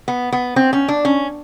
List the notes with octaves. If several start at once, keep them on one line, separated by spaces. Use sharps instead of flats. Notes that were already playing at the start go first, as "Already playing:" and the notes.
B3
B3
C4
C#4
D4
C#4